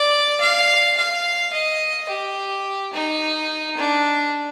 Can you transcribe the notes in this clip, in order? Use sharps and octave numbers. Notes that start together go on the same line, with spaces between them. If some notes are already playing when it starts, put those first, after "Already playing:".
Already playing: D5
F5
F5
D#5
G4
D#4
D4